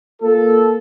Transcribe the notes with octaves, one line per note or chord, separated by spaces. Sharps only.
A#3 F4 A4